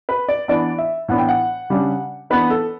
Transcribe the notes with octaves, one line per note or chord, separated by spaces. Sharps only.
B4
D5
E3 B3 D4 D5
E5
A2 E3 B3 D4 F#5
G5
F#5
C#3 G3 D4
E3 B3 D4 B4
A4